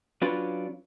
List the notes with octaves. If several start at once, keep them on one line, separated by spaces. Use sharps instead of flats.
F#3 C#4 D4 F4 B4